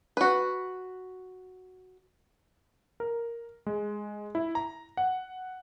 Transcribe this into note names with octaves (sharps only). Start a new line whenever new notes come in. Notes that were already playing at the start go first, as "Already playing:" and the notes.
F#4 B4
A#4
G#3
E4
A#5
F#5